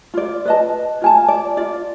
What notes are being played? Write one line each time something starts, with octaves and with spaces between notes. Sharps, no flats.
F4 D5
B4 D#5 A5
F4 G#5 A5
D5
F4 D5